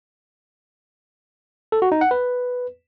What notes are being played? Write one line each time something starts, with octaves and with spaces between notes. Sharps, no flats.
A4
F#4
D#4
F#5
B4